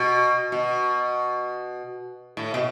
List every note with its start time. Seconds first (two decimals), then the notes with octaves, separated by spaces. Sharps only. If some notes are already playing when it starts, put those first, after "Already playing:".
Already playing: B2
0.52 B2
2.37 A2
2.54 B2